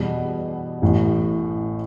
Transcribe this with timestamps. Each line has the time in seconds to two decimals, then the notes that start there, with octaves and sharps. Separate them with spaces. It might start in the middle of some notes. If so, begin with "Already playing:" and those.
Already playing: E2 B2 G3 B3
0.82 A1 A2 E3